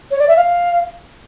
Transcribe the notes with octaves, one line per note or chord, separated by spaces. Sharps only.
C#5
D5
E5
F5